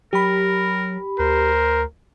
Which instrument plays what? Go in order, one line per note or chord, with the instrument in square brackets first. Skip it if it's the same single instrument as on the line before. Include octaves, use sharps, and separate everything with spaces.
[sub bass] F#3 [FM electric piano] G4 B5 [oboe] A#4
[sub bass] D2 [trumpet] A#4 [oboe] C5